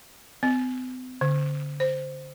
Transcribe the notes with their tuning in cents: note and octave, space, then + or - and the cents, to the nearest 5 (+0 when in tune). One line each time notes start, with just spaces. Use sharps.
C4 -45
D3 -25
C5 -5